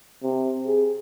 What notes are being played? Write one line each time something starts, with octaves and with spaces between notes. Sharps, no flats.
C3
G#4